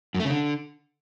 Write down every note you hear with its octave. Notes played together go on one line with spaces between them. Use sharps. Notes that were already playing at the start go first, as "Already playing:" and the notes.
F#2
A3
C#3
D3